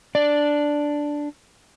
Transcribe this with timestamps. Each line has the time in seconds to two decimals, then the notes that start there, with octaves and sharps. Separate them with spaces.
0.15 D4 D5